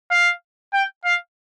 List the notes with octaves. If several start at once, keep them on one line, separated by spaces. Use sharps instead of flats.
F5
G5
F5